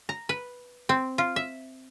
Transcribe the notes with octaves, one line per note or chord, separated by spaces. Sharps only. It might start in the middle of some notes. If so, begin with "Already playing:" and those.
A#5
B4
C4
F4
E5